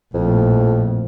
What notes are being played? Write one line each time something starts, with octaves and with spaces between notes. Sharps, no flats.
A#1 F2 A2